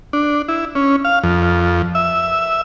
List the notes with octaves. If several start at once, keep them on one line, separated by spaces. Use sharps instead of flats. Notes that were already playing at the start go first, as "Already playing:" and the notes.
D4
E4
C#4
F5
F2
E5